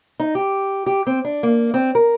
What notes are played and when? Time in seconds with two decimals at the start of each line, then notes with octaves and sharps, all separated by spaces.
0.20 D#4
0.35 G4
0.86 G4
1.07 C4
1.25 D4
1.43 A#3
1.74 C4
1.95 A#4